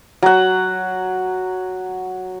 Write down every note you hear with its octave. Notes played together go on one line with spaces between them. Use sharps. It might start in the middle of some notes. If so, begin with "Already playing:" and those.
F#3 F#5